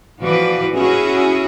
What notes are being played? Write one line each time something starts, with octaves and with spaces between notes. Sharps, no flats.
E3 F3 F#4 B4 D5
C#4 E4 F#4 G#4